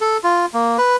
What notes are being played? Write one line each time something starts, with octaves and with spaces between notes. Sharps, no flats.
A4
F4
A#3
B4